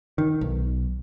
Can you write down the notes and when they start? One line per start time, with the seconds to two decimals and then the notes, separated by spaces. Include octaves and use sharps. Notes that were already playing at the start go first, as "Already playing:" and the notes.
0.18 D#3
0.41 B1